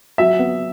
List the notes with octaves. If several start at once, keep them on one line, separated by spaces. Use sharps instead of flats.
F#3 E5
B3